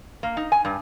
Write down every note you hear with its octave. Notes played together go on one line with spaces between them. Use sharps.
A#3
D#4
G#5
G2